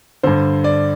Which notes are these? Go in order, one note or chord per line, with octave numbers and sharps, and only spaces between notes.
G2 D3 C5
D5